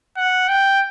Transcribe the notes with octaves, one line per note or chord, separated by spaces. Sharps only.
F#5
G5